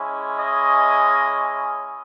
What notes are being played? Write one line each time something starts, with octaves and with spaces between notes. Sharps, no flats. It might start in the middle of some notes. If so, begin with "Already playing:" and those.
Already playing: G#3 C#4 E4
D#5